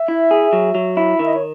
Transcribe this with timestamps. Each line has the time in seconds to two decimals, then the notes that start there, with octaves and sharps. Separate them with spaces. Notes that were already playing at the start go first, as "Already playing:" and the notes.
Already playing: E5
0.08 E4
0.31 G#4
0.53 F#3
0.75 F#3
0.97 E4
1.19 D#3 E5
1.27 D#5
1.35 C#5